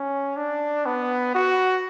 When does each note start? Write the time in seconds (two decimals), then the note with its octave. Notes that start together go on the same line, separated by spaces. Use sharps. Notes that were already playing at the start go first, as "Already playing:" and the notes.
Already playing: C#4
0.36 D4
0.86 B3
1.35 F#4